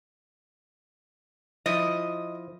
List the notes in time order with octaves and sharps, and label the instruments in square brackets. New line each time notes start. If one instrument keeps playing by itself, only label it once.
[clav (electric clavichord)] F3 E4 [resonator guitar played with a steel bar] D#5